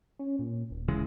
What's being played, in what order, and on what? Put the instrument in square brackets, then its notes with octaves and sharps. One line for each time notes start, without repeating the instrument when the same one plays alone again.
[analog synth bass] C#4
A#2
D#1
[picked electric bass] C#3 E3 G#3